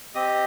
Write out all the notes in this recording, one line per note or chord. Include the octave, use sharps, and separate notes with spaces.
C4 G4 D#5 D#6